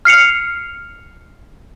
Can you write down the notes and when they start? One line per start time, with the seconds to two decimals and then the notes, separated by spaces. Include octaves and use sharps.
0.05 F6 C7 C#7 F7